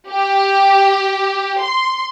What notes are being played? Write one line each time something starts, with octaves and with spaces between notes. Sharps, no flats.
G4
C6